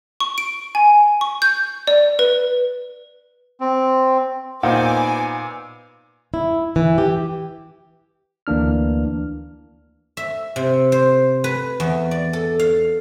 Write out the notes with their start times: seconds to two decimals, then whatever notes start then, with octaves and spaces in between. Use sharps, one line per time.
0.20 C#6
0.38 D7
0.75 G#5
1.21 C#6
1.42 G6
1.87 D5
2.19 B4
3.60 C4
4.63 A#2 B3 D#4 C5 F5 G#5 D6
6.34 E4
6.76 E3
6.98 G4
8.47 D2 E3 A#3 D4 F6
10.17 E5
10.56 C3
10.92 C5
11.44 B4
11.80 E2
12.11 D5
12.33 A4
12.59 F5